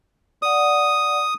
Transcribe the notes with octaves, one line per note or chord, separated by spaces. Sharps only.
D5 F#5 D#6